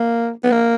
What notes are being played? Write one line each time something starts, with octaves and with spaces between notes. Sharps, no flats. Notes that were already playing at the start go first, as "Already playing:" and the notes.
Already playing: A#3
B3
A#3